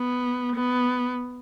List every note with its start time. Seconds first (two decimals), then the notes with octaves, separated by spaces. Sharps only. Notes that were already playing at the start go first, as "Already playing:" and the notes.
Already playing: B3
0.55 B3